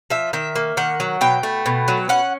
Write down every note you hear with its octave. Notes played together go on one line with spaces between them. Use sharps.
F3 E5
D#3 E5
A#3
D#3 F#5
F#3
B2 G5
A3
B2
F#3
C#4 F#5